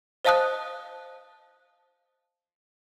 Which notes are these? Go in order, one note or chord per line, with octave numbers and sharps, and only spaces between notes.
C5 D#5 F5 A5 D#6 F#6